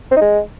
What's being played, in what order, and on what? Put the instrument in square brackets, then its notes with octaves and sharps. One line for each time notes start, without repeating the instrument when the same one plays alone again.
[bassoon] C4
D#4
G#3